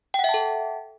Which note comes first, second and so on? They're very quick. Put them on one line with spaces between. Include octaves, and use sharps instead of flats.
G5 F#5 E5 A5 A4